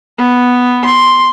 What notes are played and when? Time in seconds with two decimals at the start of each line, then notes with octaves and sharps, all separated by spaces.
0.18 B3
0.85 C6